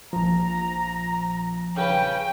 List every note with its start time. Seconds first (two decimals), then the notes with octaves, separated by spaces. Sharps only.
0.13 A#1 F3 A#5
1.77 C#3 B4 G5